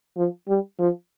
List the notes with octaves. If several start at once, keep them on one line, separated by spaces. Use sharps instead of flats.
F3
G3
F3